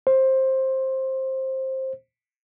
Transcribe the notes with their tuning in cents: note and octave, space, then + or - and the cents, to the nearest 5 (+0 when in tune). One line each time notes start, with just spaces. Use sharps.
C5 +15